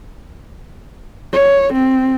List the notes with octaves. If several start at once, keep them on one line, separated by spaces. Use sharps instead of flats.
C#5
C4